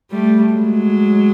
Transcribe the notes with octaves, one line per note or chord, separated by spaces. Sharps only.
G3 A3
F#3 G#3